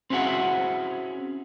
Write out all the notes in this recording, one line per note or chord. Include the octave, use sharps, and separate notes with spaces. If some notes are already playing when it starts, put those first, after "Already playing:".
C4 C#4 E4 F#4 G#4 F#5